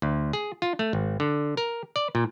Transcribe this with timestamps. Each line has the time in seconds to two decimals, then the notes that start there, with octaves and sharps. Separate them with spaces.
0.02 D2
0.33 G#4
0.62 F4
0.79 A3
0.93 G#1
1.20 D3
1.57 A#4
1.96 D5
2.15 A#2